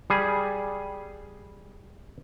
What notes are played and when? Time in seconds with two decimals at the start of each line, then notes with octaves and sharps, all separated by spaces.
0.10 G3 G#4